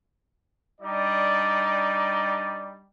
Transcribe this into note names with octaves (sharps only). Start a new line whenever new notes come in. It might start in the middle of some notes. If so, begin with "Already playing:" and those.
G3 D4 D#4 D5